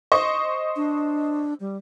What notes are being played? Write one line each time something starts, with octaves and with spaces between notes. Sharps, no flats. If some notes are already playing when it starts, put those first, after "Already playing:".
C5 D#5 C#6
D4
G3